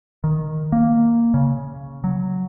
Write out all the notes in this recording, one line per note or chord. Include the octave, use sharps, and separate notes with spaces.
D#3
A#3
C#3
F#3